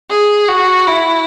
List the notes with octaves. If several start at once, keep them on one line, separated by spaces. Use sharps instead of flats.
G#4
F#4
E4